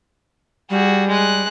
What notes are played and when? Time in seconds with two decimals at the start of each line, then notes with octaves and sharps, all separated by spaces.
0.70 G3 F#4 G#4
1.08 G#3 F#6